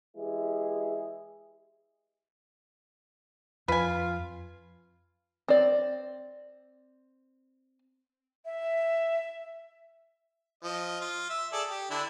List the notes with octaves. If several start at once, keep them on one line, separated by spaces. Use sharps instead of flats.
E3 G#3 E4 G4 G#4
F2 F4 B4 G#5
C4 D5
E5
F3 D#5
F4
E5
G#4 A4 D5
G4
D3 D4 E4